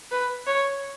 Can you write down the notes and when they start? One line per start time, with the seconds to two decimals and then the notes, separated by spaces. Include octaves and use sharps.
0.11 B4
0.47 C#5